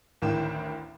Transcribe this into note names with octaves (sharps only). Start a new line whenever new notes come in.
A1 D2 D#3 E3 G5 E7